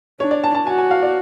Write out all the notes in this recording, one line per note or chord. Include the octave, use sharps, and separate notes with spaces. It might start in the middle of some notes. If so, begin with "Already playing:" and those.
D4 C#5
D5
A5
A5
F#4 G#5
G#5
F5
D5